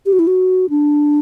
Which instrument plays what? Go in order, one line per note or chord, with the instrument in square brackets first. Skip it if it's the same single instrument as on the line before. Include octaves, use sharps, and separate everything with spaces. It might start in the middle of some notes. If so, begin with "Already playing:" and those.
[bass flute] G4
F#4
E4
F#4
D4